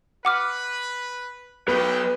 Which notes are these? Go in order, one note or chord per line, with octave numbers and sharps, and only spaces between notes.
B4 F#5 D6 F6
F#3 B3 D4 B4 G5